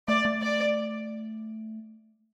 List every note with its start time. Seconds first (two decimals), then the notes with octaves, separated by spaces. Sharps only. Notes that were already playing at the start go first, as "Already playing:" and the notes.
0.08 A3 D5
0.25 A3
0.43 D5